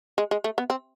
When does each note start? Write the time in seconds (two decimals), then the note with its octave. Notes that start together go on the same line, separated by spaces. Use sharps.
0.18 G#3
0.31 G#3
0.44 A3
0.58 B3
0.70 C4